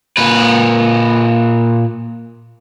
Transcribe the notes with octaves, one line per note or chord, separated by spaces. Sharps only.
A#2 B4